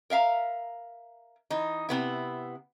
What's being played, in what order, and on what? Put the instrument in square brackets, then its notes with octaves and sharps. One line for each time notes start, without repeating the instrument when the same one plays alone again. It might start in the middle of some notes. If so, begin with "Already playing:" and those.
[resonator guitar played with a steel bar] A#4 E5 F5 A#5
E3 D#4
C3 B3 E4